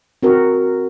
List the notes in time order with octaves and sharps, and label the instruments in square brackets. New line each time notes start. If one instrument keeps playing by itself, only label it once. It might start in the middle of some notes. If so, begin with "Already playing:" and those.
[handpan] C4 F#4 A#4